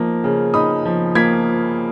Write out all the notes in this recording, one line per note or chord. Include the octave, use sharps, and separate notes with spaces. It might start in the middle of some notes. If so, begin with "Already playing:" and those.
Already playing: F3 A#3 D#4
C#3
D#4 B5 D#6
F3
A#3 G#6 B6